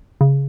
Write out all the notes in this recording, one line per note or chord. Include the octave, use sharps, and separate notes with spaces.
C#3